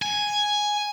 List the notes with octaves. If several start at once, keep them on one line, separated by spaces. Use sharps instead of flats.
G#5